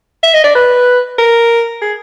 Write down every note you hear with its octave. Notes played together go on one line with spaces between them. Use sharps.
E5
D#5
D5
B4
A#4
G#4